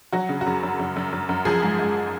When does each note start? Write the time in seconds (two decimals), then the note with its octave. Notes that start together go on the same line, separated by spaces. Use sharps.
0.13 F#3 F#4
0.29 C#3
0.41 F#4
0.46 F#2
0.63 F#2
0.80 F#2
0.96 F#2
1.13 F#2
1.29 F#2
1.45 F3 G#4
1.62 G#2
1.79 G#2